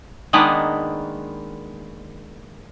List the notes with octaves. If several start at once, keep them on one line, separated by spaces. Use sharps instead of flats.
D#3 G#3 A#3 B3 D4 B4